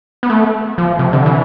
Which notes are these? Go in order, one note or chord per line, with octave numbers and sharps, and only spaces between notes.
B3
A3
F3
C3
D3
E3